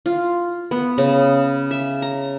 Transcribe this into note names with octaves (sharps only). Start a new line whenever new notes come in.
F4
B3
C#3
E5
A#5